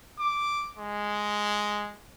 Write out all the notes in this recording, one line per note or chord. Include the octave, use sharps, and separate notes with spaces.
D6
G#3